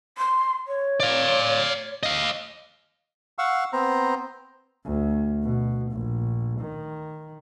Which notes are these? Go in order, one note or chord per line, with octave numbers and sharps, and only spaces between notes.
C6
C#5
D5 F5
D#5 F5
F5 F#5 C#6 E6
B3 C4 C5 A#5
D2
B2
A#1
D#3